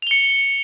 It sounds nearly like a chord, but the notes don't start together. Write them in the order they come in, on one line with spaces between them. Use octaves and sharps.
F7 G7 C#7